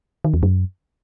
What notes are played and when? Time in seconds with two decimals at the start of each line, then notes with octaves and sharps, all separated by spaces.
0.25 D#3
0.34 E2
0.43 F#2